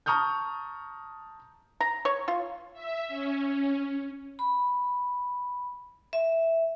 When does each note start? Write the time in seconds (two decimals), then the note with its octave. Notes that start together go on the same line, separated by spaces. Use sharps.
0.06 A5 A#5 C#6 D#6 F6 G6
1.80 A#5
2.05 C#5
2.28 F4
2.73 E5
3.08 C#4
4.39 B5
6.13 E5